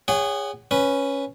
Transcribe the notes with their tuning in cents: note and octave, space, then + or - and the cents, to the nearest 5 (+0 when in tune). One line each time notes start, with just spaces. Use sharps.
G#4 -25 C#5 +15 F#5 +25
C#4 +0 B4 +0